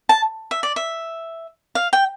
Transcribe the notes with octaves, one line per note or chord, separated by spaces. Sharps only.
A5
E5
D5
E5
F5
G5